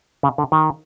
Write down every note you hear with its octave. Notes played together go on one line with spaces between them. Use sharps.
C#3
D3
D#3